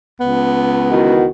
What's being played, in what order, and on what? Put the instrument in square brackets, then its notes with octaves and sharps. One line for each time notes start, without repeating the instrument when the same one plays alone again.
[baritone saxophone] C#2 [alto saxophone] B3
[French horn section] D#3 E3 F#4